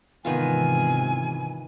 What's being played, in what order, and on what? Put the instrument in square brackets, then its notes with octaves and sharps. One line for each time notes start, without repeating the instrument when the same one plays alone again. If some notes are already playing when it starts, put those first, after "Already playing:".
[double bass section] G#2 C3 E3 [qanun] D#3 B3 F4 [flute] G#5